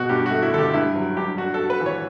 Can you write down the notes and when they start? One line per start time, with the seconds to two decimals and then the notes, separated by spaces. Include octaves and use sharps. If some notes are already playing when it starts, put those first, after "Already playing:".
Already playing: B2 F#4
0.09 G2 G4
0.26 A3 F#4
0.42 E4
0.52 D3 A4
0.58 G4
0.73 G2 E4
0.96 F#3
1.17 G2 G4
1.37 D4 F#4
1.54 A4
1.60 F#4
1.70 B4
1.80 E3
1.86 C#5